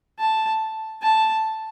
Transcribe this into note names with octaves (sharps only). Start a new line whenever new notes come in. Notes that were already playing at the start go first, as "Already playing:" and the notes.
A5
A5